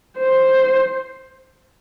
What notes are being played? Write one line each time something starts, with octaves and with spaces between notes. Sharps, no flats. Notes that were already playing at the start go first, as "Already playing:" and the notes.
C5